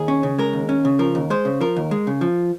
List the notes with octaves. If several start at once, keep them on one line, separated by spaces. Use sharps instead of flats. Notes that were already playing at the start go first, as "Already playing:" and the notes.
Already playing: D#2 G#4
C#4
C#3
G#3 A#4
D#2
C#4
C#3
F3 A#4
D#2
G#3 C5
C#3
F3 A#4
D#2
G#3
C#3
F3